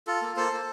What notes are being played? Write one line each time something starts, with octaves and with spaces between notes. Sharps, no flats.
F4 A4
A#3
A#3 A4 C5
A#3